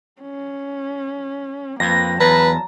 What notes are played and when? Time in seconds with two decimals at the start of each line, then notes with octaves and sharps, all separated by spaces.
0.21 C#4
1.80 F2 A#3 B4 A#6
2.20 E2 F#3 B4 A5 A#5